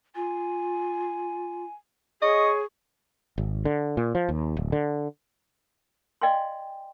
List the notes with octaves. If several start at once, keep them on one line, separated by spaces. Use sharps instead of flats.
F4 G#5
G#4 C#5 D#5 C#6
G#1
D3
A#2
F3
D#2
D1
D3
D5 D#5 F5 G5 G#5 C6